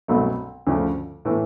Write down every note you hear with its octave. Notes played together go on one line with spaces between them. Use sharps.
C2 B2 F#3 A3
D2 C#3 F3 A3
A2 E3